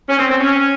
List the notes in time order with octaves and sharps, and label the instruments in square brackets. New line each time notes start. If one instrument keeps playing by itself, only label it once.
[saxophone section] C#4
C4
C4
C#4